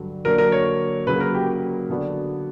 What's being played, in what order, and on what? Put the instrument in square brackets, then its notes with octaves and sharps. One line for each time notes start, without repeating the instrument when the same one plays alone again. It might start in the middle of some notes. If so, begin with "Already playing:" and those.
Already playing: [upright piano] G2 D3 F#3
[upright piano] D3 F#3 A#3 D4 [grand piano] A#4
[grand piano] A#4
C#5
[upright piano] C#3 F#3 A#3 [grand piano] B4
[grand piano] A#4
G4
[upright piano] D3 F#3 B3 D4 F#4